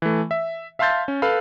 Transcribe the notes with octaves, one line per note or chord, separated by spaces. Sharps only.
E3 A3
E5
E5 F5 A5 C6 G6 A6
C#4
A4 B4 F5 B5